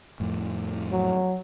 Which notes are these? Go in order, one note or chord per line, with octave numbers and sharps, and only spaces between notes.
F2 A2
F#3